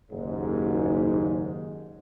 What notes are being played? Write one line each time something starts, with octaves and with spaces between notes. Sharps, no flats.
F#1 D#2 G#2